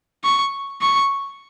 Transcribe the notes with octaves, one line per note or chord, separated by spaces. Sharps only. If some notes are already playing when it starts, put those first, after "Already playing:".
C#6
C#6